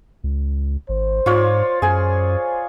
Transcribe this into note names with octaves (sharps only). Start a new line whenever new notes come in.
C#2
G#1 C5
G#2 F4 C#5 D5
F#2 G#4 C5 G#5